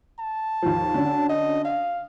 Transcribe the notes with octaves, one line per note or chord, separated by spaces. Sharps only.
A5
D#2 F3
D3 C#4 F#4
D#5
F5